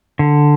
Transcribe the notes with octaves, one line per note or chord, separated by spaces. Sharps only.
D3